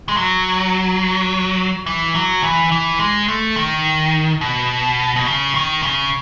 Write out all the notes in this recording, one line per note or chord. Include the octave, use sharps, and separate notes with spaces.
G#3
F#3
E3
F#3
E3
E3
G#3
A3
D#3
B2
B2
C#3
D#3
C#3